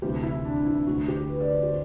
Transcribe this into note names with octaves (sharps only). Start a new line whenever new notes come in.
D2 C3 E3 G4
E4
D4
E4
D2 D3 F#4
G4
B4
D5
C5
G4